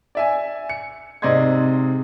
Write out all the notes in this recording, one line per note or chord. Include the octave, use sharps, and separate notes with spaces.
D5 E5 G#5
C#7
G#2 C3 D5 D#5 C6 G#6